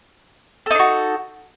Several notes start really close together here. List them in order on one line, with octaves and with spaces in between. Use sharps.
A4 D#4 D4 F#4